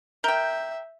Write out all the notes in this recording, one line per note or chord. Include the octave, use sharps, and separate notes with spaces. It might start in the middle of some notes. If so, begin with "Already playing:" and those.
A#4 E5 G5 G6